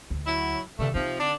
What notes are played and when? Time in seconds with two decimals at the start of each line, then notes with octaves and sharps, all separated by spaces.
0.10 D2
0.26 F#3 E4
0.79 D2 G2 C3 D#3 A3
0.94 C3 F3 C4 D#4
1.19 D3 D4